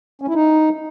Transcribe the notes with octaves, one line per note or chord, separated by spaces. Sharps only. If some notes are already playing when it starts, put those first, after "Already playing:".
C#4
E4
D#4